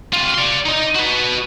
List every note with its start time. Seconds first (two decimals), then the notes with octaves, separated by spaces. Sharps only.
0.13 C3 F4
0.35 D5 C6
0.66 D#4 D#5
0.96 F#4 B4